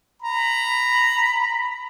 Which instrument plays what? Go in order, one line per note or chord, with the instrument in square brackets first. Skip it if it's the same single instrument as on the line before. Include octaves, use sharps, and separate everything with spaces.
[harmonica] A#5 [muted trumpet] B5